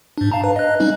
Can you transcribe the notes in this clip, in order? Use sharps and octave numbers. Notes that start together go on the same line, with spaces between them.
G#2 D4
F5 A5 A#5
B4
D#5 F#6
G3 C#4 D#4